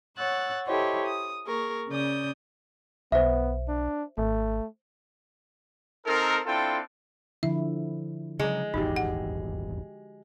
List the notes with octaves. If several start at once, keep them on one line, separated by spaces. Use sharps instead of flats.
C#5 F#5 E6 F#6 A6
E4 G4 A4 C5 C#5 D#5
D#6
A#3 G#4 A#4 C#6
C#3 D5 D#6 G6
B1 B3 C5 E5
D4
G#1 A3
C4 D#4 A4 A#4
C4 D4 E4 F4 A4 G5
D3 F3 E4 E5
C#3 F#3 G#3
D#1 G#1 E2 D#4 F#4 G4
F#5